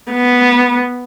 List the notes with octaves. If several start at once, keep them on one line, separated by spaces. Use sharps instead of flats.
B3